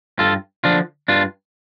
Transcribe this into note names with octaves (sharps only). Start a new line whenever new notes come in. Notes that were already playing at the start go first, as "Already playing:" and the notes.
G2 F4 A4
D3 F3 D4 F4
G2 D4 F4